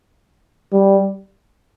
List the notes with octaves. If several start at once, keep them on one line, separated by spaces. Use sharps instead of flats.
G3